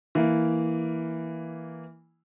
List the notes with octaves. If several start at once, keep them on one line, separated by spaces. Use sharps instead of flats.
E3 A#3